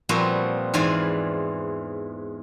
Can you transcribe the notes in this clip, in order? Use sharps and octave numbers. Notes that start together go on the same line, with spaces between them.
A#2 F3 G3 B3 C4 F#4
E2 G#2 E3 F4 D5 G#5